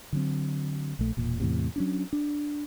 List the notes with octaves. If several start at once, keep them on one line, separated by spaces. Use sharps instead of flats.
D3 F#3 C4
A#1 A3
E1 A#2
E2 A2 C3
F#3 C#4 D4
D4